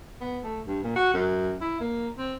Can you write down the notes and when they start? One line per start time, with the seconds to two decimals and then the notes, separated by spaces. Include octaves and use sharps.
0.21 B3
0.44 A3
0.67 G2
0.84 A#2
0.96 F#4
1.14 F#2
1.61 E4
1.80 A#3
2.18 C4